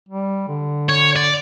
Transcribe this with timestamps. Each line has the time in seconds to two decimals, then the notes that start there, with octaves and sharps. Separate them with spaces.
0.09 G3
0.48 D3
0.89 C#5
1.16 D5